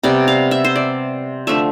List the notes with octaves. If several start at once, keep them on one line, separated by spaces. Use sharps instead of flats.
C3 G3 B3 D5
F5
E5
C5
D5
D3 F3 A3 E5